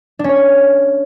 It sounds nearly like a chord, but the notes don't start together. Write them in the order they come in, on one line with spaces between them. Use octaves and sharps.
D4 C#4 C#5